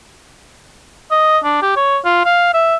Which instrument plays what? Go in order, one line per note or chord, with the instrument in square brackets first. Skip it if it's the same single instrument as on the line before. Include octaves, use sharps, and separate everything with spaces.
[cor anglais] D#5
D4
G4
C#5
F4
F5
E5